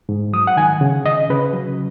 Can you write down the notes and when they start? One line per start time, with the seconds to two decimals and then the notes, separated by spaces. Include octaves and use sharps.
0.09 G#2
0.33 F#3 D#6
0.47 F#5
0.57 D#3 G#5
0.81 C#3
1.06 C#3 D#5
1.30 C#3 B4
1.53 F#3